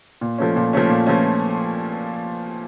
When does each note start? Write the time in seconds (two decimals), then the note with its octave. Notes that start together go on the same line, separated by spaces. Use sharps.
0.21 A#2
0.38 F3 A3 C#4
0.56 A#2
0.73 F3 A3 C#4
0.90 A#2
1.06 F3 A3 C#4